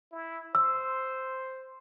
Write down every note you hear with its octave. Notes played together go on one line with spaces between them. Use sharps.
E4
C5 E6